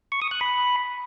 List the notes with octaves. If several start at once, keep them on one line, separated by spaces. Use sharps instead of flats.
C#6
D#6
F#6
B5